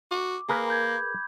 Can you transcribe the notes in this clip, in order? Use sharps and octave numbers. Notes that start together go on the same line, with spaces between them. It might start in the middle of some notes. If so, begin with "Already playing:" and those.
F#4 D6
A#3 G#4 A#4 B4
B5 G6 G#6